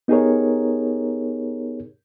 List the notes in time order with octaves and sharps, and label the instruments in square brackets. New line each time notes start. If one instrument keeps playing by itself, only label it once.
[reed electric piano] B3 D#4 G4 G#4 A#4 C#5